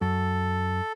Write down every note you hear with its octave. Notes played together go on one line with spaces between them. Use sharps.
F#2 A4